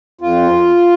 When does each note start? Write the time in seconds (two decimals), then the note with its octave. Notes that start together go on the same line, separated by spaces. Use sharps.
0.21 F2 F4